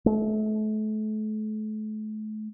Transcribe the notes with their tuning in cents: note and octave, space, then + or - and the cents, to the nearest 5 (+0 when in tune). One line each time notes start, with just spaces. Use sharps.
A3 -35